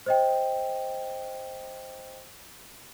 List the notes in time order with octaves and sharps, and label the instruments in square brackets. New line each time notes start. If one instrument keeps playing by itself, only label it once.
[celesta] C5 D#5 G5